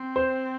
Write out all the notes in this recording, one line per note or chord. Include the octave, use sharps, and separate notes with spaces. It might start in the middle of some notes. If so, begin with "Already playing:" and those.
Already playing: C4
C5